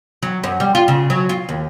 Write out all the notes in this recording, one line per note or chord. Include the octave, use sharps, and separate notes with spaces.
F#3
F#2
G3
F4
C#3
F#3
F4
D#2